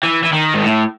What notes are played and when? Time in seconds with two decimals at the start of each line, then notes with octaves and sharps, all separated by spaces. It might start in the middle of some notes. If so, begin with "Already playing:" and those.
0.03 E3
0.23 E3
0.33 D#3
0.54 G#2
0.63 A2